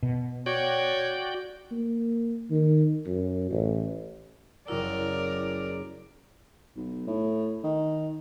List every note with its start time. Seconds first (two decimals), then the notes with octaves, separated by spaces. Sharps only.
0.03 B2
0.46 F#4 C#5 D5 G5
1.72 A#3
2.50 D#3
3.06 F#2
3.51 A1
4.68 F#1 E4 F#4 A#4 D5
6.76 B1
7.07 A2
7.64 D#3